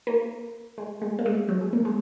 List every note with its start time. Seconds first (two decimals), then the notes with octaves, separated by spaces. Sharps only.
0.07 A#3
0.78 G#3
1.02 G#3
1.19 A#3
1.26 G#3
1.48 F#3
1.61 G#3
1.73 A#3
1.85 G#3